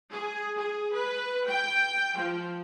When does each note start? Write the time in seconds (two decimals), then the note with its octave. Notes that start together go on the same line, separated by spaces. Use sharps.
0.12 G#4
0.58 G#4
0.94 B4
1.49 G5
2.17 F3